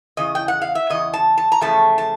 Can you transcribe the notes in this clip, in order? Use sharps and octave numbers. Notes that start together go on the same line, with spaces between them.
E2 C#3 D#5
G5
F#5
F5
E5
E2 C#3 D#5
A5
A5
A#5
E2 C#3 F3 A3 A5
A5